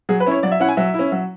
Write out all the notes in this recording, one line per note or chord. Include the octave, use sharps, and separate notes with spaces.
F#3 G#4
B4
C#4 E4 C#5
F#3 D5
E5
C#4 E4 F#5
G#5
F#3 E5
E4
C#4
F#3